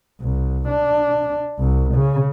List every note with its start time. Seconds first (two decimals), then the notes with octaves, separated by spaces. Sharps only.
0.21 C2
0.68 D4
1.59 C2
1.95 C#3